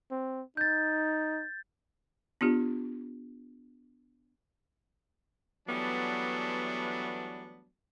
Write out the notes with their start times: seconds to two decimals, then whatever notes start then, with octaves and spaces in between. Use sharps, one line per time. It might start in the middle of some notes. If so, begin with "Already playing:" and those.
0.11 C4
0.57 D#4 G6 A6
2.41 B3 D4 F4 G4
5.67 E3 F#3 G3 A3 B3 D4